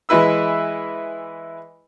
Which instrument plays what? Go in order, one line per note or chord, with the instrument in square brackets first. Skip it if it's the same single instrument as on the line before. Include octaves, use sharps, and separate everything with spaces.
[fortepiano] E3 G#3 E4 B4 E6